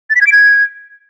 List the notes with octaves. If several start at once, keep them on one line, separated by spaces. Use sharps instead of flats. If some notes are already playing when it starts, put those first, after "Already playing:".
A6
B6
G#6
D7
G#6